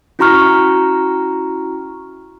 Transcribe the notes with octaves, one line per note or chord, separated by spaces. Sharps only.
C#4 E4 F#4 A#5 C#6 F6